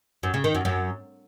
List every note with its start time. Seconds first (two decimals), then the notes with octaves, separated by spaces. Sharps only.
0.23 F#2
0.34 C#3
0.44 D#3
0.55 F#2
0.65 F#2